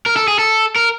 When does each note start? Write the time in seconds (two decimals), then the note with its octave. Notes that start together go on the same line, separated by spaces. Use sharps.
0.06 A#4
0.16 A4
0.28 G#4
0.39 A4
0.76 A#4